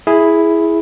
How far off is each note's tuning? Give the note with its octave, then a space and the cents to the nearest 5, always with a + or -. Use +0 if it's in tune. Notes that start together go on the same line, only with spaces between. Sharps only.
E4 +0 G#4 +5